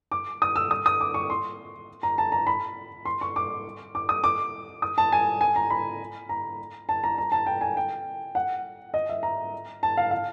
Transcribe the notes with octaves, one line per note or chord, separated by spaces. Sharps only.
D6
D#6
E6
D#6
D#6
D6
C#6
C6
A#5
A5
A#5
B5
C6
C#6
D6
D6
D#6
D6
D#6
A5
G#5
G#5
A#5
B5
A#5
A5
A#5
A#5
A5
G5
G#5
G5
F#5
D#5
E5
A#5
A5
F5
F5